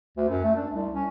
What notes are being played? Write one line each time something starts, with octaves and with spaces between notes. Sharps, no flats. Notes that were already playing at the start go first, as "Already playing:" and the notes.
D2
F#2
A3
D4
C2
C#4